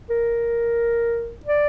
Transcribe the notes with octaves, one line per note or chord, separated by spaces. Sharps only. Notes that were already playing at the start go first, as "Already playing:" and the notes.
A#4
D5